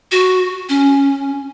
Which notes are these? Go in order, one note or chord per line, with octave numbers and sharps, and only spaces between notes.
F#4
C#4